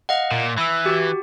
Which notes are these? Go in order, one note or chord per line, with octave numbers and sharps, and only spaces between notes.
D#5 F5 F#5
A#2
E3 B5 E6
F#4 G4